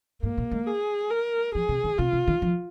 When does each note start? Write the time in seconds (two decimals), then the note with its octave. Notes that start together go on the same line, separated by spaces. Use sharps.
0.23 G#2 A#3
0.38 A#2
0.51 G#3
0.67 G#4
1.10 A#4
1.55 F3 G#4
1.69 C3
1.84 D#3
1.98 C3 F4
2.13 C3
2.28 D#3
2.42 F3